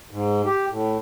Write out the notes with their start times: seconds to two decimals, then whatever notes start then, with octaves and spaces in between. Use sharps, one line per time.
0.11 G#2
0.45 G4
0.70 A2